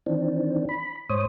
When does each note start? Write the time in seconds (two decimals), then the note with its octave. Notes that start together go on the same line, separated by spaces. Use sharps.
0.06 D#3 E3 C4 D4
0.69 B5
1.10 G#2 C5 C#5 D#6